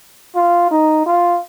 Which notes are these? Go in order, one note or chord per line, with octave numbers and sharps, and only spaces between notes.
F4
D#4
F4